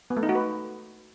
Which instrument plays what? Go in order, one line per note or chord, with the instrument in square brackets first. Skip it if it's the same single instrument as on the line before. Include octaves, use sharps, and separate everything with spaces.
[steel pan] B3
A3
D#4
F#4
B4